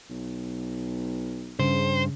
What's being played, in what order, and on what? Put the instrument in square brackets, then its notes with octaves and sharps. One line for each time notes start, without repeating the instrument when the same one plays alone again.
[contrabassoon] B1
[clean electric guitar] G2 [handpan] C#3 [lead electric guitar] C5